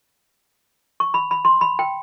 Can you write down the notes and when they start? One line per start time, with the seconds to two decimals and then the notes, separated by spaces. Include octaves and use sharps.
1.00 C#6
1.14 B5
1.31 B5
1.45 C6
1.61 B5
1.79 G5